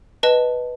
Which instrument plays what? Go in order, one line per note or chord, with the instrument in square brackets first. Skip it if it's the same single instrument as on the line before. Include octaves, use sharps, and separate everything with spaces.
[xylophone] B4 D#5 A5